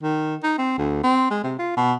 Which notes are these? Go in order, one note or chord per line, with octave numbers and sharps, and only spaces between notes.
D#3
D#4
C4
D2
C4
G#3
C3
F4
B2